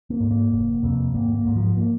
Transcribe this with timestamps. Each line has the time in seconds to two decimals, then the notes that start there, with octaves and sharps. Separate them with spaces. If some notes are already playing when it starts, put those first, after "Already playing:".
0.10 A#3
0.20 G#2
0.31 A#3
0.52 F1
0.83 F2 C3
1.14 G#1 A#3
1.35 A#3
1.45 G#2
1.56 F3
1.77 A#3